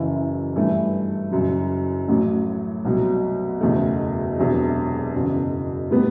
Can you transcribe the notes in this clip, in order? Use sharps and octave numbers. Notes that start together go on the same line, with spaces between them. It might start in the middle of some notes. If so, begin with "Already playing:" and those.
Already playing: F#1 F#2 E3
G2 E3 A3
F#1 F#2 F#3
A1 A2 F#3
C2 B2 F#3
F#1 E2 B2 A3
E1 E2 C3 F#3
F#1 E2 B2
A2 G3 B3